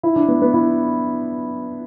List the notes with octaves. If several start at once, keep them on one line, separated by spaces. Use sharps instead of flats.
E4
D4
B3
B3
E4